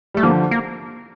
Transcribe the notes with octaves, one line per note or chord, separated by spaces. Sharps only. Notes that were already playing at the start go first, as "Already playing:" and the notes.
G3 A3
D3 F3 A#3
A#3